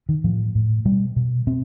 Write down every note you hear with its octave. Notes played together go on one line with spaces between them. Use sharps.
D#3
A2 F3
A2
B2 G3
B2
B2 C4